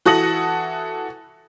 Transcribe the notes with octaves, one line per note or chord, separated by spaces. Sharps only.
E3 F#4 A4 D#6 A#6 F#7